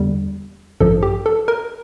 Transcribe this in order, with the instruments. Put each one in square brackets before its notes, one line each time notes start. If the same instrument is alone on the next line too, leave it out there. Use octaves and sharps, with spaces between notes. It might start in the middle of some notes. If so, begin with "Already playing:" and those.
Already playing: [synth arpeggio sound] E2 D3 G3
A1 G2 F3 A4
G4
A4
A#4